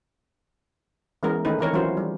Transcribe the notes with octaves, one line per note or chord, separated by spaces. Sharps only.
E3 G#3 B3 C#4 A#4
D#3 A3 C#4 D#4 B4
D#3 E3 C4 A#4 C#5
E3 F#3 C#4 F4 F#4 C5
G3